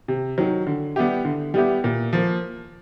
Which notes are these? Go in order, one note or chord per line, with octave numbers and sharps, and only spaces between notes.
C3
D#3 F#3
D3
G3 B3 E4 G4
D3
G3 B3 E4 G4
A#2
F3 A#3